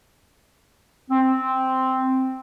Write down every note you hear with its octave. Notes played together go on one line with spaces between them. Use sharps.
C4